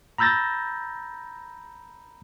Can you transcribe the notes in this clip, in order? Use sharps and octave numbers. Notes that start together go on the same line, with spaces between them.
A#5 B5 E6 G6 A6 A#6